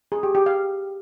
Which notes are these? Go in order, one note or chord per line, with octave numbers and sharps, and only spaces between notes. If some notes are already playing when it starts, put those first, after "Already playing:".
G#4
G4
G4
F5